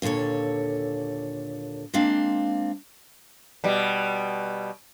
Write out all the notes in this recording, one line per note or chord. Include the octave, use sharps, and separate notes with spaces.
D#2 A#2 D3 A4 C#5
G#3 A#3 C4 D4 F5
B2 G3